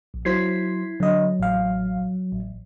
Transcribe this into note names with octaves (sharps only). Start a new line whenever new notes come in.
A#1
F#3 E4 C5 G#6 B6 C7
D3 F#3 D#5
A1 F5
A1